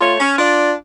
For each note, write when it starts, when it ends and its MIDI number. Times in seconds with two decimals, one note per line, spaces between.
0.01 0.15 57
0.01 0.15 65
0.01 0.15 73
0.19 0.36 61
0.38 0.73 62
0.38 0.73 65
0.38 0.73 74